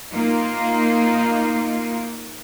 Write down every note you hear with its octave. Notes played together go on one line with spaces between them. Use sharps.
A#3 D#4 F4